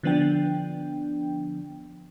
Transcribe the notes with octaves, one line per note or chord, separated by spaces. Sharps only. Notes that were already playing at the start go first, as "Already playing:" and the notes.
D3 F3 B3 D4 G5